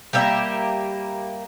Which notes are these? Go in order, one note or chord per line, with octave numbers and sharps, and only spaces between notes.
G3 A#3 G4 E5